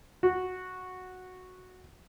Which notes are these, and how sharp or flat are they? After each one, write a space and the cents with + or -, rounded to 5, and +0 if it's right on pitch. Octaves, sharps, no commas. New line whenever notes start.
F#4 -5